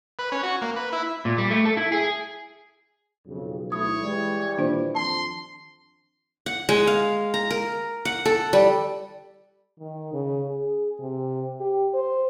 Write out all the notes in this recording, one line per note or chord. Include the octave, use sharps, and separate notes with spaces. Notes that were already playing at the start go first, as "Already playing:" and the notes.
B4
C#4
F#4
A#3
B4
E4
A#2
G3
A3
A4
E4
G#4
B1 F2 C#3
D2 A3 E4 C#5 D#6
E3 G3 G#3
A#2 D#3 D4 C5
F2 A5 C6
F#5
G#3
F5
A#5
A#4
F#5
A4
G3
D#3
C#3
G#4
C3
G4
C5